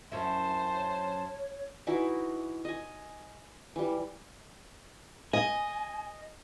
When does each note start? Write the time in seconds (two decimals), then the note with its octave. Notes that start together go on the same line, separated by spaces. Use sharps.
0.12 F#2 C#4 E4 C5 A5
0.75 C#5
1.87 E3 D#4 E4 F#4
2.65 D#5 G#5
3.76 E3 G3
5.33 D#5 G#5